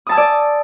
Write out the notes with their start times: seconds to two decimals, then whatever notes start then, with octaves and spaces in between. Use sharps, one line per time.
0.07 D#6
0.09 A5
0.12 E6
0.15 G#5
0.17 D5